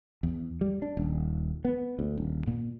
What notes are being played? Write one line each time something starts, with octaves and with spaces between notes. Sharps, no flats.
E2
G3
D4
D#1
B3
D2
D#1
A#2